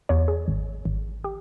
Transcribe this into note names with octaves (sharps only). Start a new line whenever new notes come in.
E2 C#5
G#4
G#1
G#1
G4